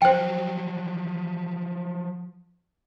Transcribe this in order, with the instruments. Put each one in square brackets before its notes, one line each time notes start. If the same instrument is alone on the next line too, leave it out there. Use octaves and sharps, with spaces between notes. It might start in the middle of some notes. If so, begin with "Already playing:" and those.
[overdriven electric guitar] F3 F#3 [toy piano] C5 G5